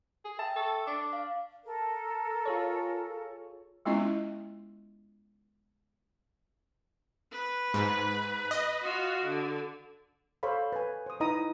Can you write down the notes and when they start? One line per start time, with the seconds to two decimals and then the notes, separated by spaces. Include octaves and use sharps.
0.25 G#4
0.39 E5 G5 A5
0.56 A4 A5 C#6 E6
0.87 D4 D6
1.13 F5
1.65 A4 A#4
2.45 F4 G#4 C#5
3.86 G#3 B3 C#4 E4 F4 D#5
7.31 B4
7.74 G#2
8.51 D#5
8.82 F4 F#4
9.23 D3
10.43 A4 C5 C#5 F5 B5
10.72 B4 G#5
11.06 C5 D#6
11.20 D#4 E4 B4 D#5 A#5 D#6